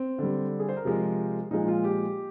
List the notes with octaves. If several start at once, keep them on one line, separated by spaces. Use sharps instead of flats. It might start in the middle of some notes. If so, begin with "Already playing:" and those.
Already playing: C4
D3 G3
G#4
C5
A#4
C3 F3 G#3
A#2 F3 G#3 D#4
F4
G4